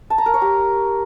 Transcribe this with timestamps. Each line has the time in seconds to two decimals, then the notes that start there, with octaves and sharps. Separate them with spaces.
0.10 A5
0.18 A#5
0.26 A#4
0.34 C#5
0.42 G4